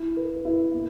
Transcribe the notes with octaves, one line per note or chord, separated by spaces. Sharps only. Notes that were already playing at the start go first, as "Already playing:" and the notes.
Already playing: E4
B4
E4
A#3